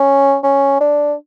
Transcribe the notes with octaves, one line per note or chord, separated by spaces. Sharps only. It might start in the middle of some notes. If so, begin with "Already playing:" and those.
Already playing: C#4
C#4
D4